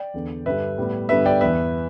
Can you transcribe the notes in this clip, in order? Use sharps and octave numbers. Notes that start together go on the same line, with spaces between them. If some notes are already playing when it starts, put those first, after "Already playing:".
Already playing: D5 G5
E2 D3 B3
G2 D3 G3 B4 E5
A2 G3 B3
G2 D3 G3 B3 B4 E5
D5 G5
E2 E3 B3 B4 E5